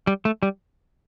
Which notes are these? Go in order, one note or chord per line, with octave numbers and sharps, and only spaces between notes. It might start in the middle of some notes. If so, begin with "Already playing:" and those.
G3
A3
G3